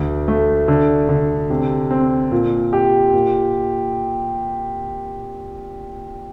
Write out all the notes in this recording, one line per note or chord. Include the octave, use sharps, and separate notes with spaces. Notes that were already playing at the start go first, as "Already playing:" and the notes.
Already playing: D2
A3
D3
D3
C3
C4
A#2
G4
A#2